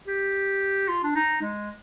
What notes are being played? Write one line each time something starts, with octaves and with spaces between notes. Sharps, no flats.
G4
F4
D4
D#4
G#3